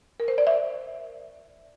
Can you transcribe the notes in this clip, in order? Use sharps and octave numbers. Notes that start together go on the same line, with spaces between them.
A#4
C5
D5
E5